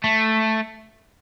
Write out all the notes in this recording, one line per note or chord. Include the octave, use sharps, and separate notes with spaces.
A3